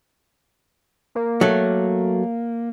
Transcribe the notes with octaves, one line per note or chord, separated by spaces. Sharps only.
A#3
F#3 A3